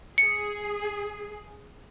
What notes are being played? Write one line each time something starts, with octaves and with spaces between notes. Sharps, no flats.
G#4 C#7